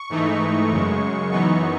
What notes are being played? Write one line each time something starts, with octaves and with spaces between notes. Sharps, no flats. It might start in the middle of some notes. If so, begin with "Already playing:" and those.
Already playing: C#6
G#2 E3 A3 D#4
F#2 C#3 G#3
F#2 E3 B3 D#4 C#6